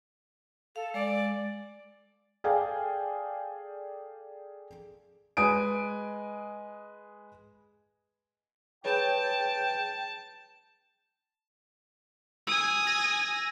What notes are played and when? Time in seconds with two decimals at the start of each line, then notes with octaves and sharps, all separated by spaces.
0.76 A4 F5
0.94 G#3 D5
2.44 G#4 A4 D5 F5 G5 G#5
5.37 G#3 B4 G#5 D#6 D7
8.85 G#4 B4 C#5 G5 A5
12.47 G#5 D#6 E6
12.87 E6 A#6 D#7